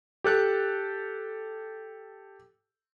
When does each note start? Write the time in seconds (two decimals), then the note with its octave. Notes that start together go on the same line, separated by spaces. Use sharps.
0.24 G4 A4 F#6